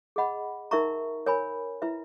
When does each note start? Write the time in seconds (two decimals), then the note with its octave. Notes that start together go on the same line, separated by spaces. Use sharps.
0.16 G#4 D#5 F#5 B5
0.71 D#4 A#4 E5 A#5 C#6
1.26 A#4 C#5 G#5 B5
1.82 E4 B4 E5